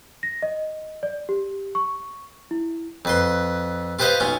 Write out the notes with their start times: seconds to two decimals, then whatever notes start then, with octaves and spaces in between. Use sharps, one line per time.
0.23 A#6
0.42 D#5
1.03 D5
1.29 G4
1.75 C#6
2.51 E4
3.05 F2 B4 C6
3.99 F4 G4 B4 C5 D#5 F5
4.20 B1 C#4 F4